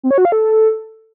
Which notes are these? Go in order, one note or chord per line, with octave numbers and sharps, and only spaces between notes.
C4
C#5
F#4
F5
A4